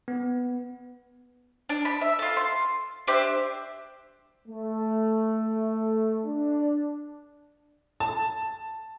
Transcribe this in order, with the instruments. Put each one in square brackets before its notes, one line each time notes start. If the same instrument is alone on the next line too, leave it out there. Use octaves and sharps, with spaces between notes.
[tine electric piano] B3
[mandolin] D4
B5
E5
F4 A4
C6
D4 G4 C5 E5
[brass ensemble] A3
D4
[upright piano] A5